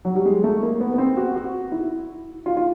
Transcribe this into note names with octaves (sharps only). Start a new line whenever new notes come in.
F#3
G3
G#3
A3
A#3
B3
B3
C4
F#4
F#4
E4
F4
F4